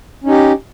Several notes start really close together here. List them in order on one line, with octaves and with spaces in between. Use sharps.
C#4 D#4 G4